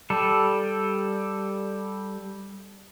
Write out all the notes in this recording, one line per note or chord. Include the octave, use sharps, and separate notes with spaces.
G3 A4